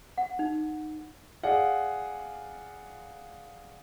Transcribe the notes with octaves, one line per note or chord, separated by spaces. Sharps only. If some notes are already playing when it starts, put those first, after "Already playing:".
F#5
D#4
G#4 D5 F5 F#5